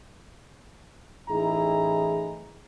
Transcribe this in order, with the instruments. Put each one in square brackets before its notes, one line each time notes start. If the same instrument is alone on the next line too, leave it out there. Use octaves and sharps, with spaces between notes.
[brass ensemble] A1 D#4 E4 G#4 A#5